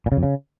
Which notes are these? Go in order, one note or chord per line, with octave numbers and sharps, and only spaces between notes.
A#2
C#3
F2
C#3